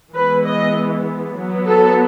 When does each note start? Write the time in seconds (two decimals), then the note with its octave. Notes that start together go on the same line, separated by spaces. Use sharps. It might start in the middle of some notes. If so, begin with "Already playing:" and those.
0.12 E3 G#3 B3 B4
0.44 D#5
1.36 F#3 B3
1.68 A4